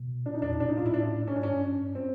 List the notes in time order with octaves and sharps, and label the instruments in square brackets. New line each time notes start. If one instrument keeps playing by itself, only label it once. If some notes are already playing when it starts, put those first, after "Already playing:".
Already playing: [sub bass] B2
[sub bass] A#2 [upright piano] D4
[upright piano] D#4
[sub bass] E2 [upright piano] D4
[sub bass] B2 [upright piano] D4
[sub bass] A#2 [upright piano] D#4
[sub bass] A2 [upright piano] F4
[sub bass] A#2 [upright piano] E4
[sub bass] A2 [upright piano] D4
[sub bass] G#2 [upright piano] C#4
[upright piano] D4
[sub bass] G2 [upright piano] C#4
[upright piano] C4